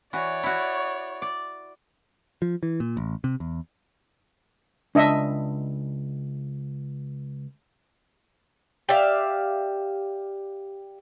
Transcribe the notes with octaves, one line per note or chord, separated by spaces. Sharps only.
E3 F#4 C#5 D5
E4 F#4
D5
F3
E3
A#2
A1
C3
E2
C#2 D4 D#5 E5
G4 D5 E5 F5